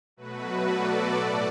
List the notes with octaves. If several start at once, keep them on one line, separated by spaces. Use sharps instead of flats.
B2 F#3 A3 F#4 B4
A4 D5
A2 A3 D5 F#5